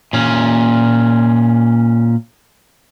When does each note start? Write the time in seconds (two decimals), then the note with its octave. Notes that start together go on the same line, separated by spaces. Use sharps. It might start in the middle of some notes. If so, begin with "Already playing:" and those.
0.13 A#2 C#4